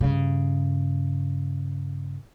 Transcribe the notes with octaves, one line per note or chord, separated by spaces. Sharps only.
G2 C#3